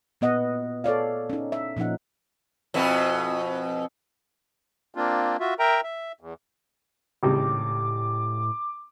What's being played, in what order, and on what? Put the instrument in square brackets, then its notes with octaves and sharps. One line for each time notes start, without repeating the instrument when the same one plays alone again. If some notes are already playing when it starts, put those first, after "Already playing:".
[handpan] A#2 B3 D#5 F#5
A4 C#5 D5 F5
C#4 D#4
E5
A#2 F3 C#4 D#4 F#5
[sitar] F2 B2 E4
[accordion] A#3 C4 D4 F4
F4 F#4 E5
A#4 E5 G5 A#5
E5
E2
[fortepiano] G#1 C#2 G3 [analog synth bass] A2 [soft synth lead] D6